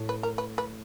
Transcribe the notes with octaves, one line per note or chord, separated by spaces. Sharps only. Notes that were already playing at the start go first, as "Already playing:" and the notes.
Already playing: A2
B4
A#4
B4
B4